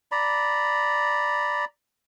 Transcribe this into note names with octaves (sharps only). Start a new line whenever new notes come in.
D5 A#5 B5